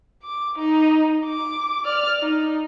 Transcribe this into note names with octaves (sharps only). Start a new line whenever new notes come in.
D6
D#4
D6
D5 F6
D#4